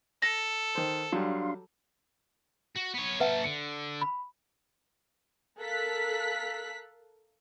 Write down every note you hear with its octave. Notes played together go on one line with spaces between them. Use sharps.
A4 A#6
D#3 C5
F#3 G3 D4 F5 C6
F#4
B3 C#5
A#3 B4 E5 F#5 A5
D3 C#7
B5
A4 A#4 F5 F#6 B6